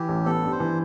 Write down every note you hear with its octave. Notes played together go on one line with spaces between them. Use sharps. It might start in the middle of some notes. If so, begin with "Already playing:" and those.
Already playing: E3 G4
A1
B3 A4
G2
C5
E3